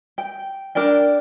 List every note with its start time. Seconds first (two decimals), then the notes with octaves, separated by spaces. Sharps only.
0.18 G5
0.75 D4 A#4 D5 G5